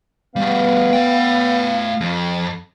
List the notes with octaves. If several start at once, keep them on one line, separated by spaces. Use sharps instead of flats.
G3 A3 B3 F5
A3 G5
F2